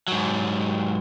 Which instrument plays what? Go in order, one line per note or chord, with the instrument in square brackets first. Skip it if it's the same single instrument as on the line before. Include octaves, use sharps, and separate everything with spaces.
[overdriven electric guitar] G#2 F#3